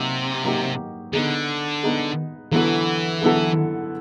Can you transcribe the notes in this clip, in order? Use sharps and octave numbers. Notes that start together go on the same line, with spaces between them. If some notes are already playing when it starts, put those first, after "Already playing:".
Already playing: C3 F#3 A#3 D#4 G4
F#3 A#3 D#4 G4
D3 B3 D#4 G#4
B3 D#4 G#4
D3 E3 F#3 B3 E4 A4
D3 F#3 B3 E4 A4